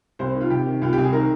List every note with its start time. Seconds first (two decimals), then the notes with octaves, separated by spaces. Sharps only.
0.19 C2 C5
0.35 D#3
0.41 F4
0.50 C3 G4
0.67 D#3
0.82 C2 F4
0.93 G4
0.98 C2
1.03 G#4
1.13 D#3 A#4